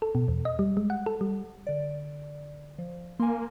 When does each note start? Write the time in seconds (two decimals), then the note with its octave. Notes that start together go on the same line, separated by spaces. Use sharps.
0.02 A4
0.15 B2
0.28 E2
0.45 D#5
0.59 G3
0.77 G#3
0.90 F#5
1.06 A4
1.21 G3
1.67 D3 D5
2.78 F3
3.20 A#3 G#5 C6